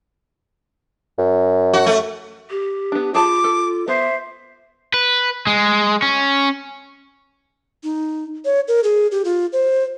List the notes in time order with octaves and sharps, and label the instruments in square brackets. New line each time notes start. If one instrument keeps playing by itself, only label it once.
[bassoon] F#2
[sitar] F#4
A3
[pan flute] G4
[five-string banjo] B3 D4
[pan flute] F4 [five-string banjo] G#4 A5 B5 [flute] D6
[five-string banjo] A4
[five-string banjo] B3 [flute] C5 [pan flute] E5
[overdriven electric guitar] B4
G#3
C#4
[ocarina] D#4
C#5
A#4
G#4
G4
F4
C5